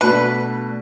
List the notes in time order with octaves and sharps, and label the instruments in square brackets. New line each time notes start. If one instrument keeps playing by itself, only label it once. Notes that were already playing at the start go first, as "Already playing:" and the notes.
[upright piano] B2 A3 D4 [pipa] B4